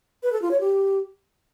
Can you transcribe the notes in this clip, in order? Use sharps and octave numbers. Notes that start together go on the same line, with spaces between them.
B4
A4
F4
C#5
G4